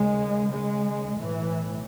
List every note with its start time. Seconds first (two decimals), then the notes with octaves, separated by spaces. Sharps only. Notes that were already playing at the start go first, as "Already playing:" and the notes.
Already playing: D#2 C#3 G#3
0.52 G#3
1.16 B1 A2 E3